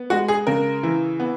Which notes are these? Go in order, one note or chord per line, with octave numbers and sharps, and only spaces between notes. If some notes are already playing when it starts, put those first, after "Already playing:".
Already playing: B3
G#3 F#4
G#4
C#3 A#4
E3
B3